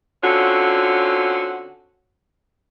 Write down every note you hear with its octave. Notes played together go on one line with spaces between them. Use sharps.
D3 C4 C#4 F4 F#4